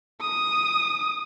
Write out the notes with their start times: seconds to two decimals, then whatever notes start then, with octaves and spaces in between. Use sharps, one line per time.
0.21 D#6